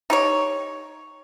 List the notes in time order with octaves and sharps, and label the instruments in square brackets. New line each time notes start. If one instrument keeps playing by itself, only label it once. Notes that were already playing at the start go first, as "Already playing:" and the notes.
[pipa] D#4 G4 C#5